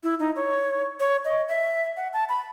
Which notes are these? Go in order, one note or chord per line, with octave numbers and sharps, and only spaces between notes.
E4
D#4
C#5
C#5
D#5
E5
F#5
A5
B5